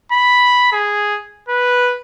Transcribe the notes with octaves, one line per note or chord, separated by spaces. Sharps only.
B5
G#4
B4